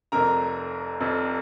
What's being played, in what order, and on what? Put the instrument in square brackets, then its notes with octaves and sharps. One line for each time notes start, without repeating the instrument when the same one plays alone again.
[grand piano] F1 F2 C3 A#4 A#5
F1 F2 C3